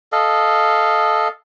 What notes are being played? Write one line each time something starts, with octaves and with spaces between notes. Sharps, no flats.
A4 D#5 F5